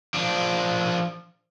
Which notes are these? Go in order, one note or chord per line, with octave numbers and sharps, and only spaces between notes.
F3 D4